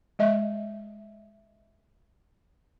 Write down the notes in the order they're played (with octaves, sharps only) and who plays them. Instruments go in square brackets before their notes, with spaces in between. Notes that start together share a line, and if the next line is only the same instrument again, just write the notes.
[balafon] G#3 D#5 E5